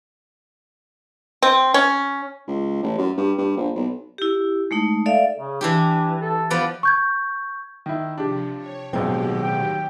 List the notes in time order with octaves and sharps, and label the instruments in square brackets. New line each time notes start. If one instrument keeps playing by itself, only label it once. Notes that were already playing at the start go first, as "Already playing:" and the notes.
[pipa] C4
C#4
[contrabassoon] C#2
A1
F#2
G2
G2
A#1
B1
[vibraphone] E4 G4
G#3 A3 D#4
A4 D5 E5 F5
[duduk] C#3
[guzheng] E3 E4 G4 [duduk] D4
[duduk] A4
[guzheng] F3 B3 D5 [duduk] B4
[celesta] C#6 G6 G#6
[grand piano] D#3 E4
[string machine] C3 F3 [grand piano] D4 G4
[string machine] C#5
[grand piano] D1 A#1 [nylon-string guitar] B2 G#3 C4 [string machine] D#3 F#3 G4
[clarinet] G5